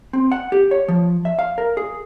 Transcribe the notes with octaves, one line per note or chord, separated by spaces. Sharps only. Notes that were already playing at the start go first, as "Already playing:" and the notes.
C4
F#5
G4
C#5
F3
E5
F5
A#4
G#4